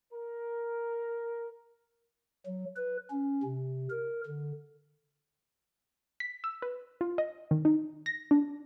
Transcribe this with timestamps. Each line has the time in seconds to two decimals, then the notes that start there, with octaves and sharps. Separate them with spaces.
0.13 A#4
2.46 F#3
2.76 B4
3.10 C#4
3.44 C3
3.90 A#4
4.26 D3
6.20 B6
6.44 E6
6.62 B4
7.01 F4
7.18 D#5
7.51 D#3
7.65 D#4
8.06 A#6
8.31 D4